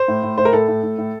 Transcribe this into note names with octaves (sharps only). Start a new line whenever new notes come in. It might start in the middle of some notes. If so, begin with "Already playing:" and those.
Already playing: C5
A2
A2
A2 C5
A#4
A2 A4
A2
A2
A2